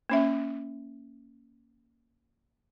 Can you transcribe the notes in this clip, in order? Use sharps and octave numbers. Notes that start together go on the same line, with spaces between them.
A#3 C#4 E5